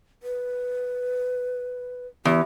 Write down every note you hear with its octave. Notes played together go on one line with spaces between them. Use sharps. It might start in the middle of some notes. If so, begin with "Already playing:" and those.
B4
E2 G4